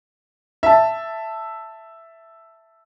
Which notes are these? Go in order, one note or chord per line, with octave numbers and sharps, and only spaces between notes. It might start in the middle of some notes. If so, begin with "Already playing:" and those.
E5 A5